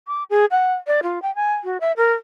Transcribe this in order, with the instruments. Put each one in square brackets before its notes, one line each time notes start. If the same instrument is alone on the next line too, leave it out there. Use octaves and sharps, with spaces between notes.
[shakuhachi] D6
G#4
F#5
D5
F4
G5
G#5
F#4
E5
A#4